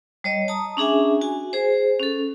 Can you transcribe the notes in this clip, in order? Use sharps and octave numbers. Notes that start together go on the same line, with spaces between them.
G3 C#5 D#5
A5 A#5 D#6
C#4 D4 G#4 E5 G#5
F#4 G#5
G#4 C5
C#4 A4